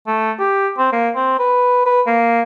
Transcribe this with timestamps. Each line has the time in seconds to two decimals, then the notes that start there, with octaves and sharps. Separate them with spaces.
0.07 A3
0.39 G4
0.78 C4
0.92 A#3
1.15 C4
1.39 B4
1.86 B4
2.07 A#3